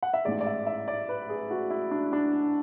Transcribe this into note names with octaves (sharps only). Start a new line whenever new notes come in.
F#5
E5
A1 G#2 G#3 D5
D5
E5
E5
D5
B4
G#4
F#4
E4
D4
D4